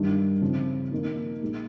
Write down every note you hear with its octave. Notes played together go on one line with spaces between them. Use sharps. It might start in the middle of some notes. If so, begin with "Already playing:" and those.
Already playing: G2 D#3 G3
C#3 F3 C4
D#3 A#3 D#4
A#2 G#3 D#4